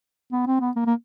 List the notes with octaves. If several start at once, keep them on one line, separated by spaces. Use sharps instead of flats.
B3
C4
B3
A#3
A#3